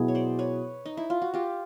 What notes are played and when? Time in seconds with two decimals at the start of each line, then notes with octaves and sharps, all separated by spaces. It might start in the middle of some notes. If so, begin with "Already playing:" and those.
Already playing: B2 F#3 B3 E4 G#4
0.08 C#5
0.15 C5 D5
0.39 B4 C#5
0.86 D#4
0.97 E4
1.10 F4
1.22 F#4
1.34 F4 G4